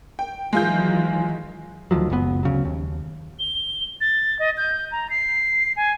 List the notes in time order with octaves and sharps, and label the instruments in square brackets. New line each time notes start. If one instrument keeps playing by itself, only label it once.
[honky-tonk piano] G5
[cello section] D#3 E3 F#3 [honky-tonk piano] G#3 F4 G6
[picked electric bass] D2 D#3 F3 F#3
F#1 C#2 A2 B3
D2 C#3 F#3
D#2
[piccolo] G7
A6
D#5
G6
A#5
C7
G#5